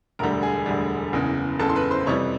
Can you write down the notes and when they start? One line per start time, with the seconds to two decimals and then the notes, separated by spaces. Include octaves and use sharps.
0.19 E1 D2 D3 G3 A#4 A#5
0.43 G#4 G#5
0.66 E1 D2 D3 G3
1.13 F#1 E2 C#3
1.59 F#1 E2 C#3 A4 A5
1.69 C6
1.76 B4 B5
1.91 C5 C6
2.06 F2 C3 E3 G3 C#5 C#6